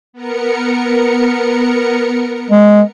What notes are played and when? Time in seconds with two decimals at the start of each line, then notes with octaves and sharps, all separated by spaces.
0.13 B3 A#4 C#7
2.50 G#3